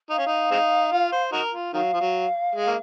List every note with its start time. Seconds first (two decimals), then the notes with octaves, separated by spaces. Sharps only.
0.10 D#4 F5
0.19 C#4
0.27 D#4
0.51 G#3 C4 D#4
0.92 F4
1.12 C5
1.33 D#4 F#4 A#4
1.53 F4
1.73 D#3 F#3 F5
1.93 F3
2.01 F#3
2.55 G#3
2.67 A#3